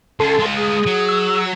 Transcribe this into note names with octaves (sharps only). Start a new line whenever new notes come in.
C#2 C#4 A4 A5 C6
G#3 F4
G#4 D#6
F#3
E6